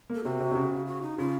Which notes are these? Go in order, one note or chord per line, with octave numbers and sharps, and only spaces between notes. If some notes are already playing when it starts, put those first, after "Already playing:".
A#3
A4
C3 F#4
C3
C3
C#3
F#4
D#4
C#3 F4